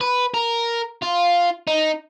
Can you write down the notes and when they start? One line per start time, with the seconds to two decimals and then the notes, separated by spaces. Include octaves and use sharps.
0.01 B4
0.34 A#4
1.02 F4
1.67 D#4